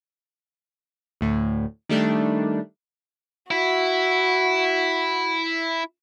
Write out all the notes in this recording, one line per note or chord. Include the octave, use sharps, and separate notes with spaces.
D2 A2
D#3 G3 A3 D4
E4 F#4